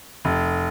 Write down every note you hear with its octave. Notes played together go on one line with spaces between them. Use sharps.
F1